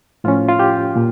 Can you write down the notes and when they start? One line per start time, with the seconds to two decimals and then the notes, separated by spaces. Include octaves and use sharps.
0.24 A2 F3 C#4 F4
0.49 F4
0.59 G4
0.96 A#2